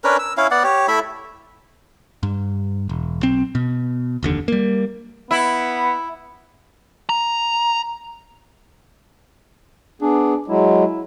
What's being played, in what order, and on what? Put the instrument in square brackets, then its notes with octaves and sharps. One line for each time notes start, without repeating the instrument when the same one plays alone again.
[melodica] C#4 D4 A#4 B4
E6
C#4 E4 F5
B3 D5 F#5
G4 C#5
A3 E4 E5 B5
[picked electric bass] G2
E1
B1 C4
B2
F1 D#2 D3
G3 A#3
[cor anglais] B3 [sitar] E4
[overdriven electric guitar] A#5
[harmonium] B3 G#4 [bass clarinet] D4
[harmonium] F#3 G#3 [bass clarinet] E4